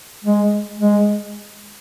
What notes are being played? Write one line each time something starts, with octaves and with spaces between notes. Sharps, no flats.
G#3
G#3